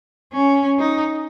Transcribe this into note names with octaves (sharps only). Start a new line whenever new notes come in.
C#4
D#4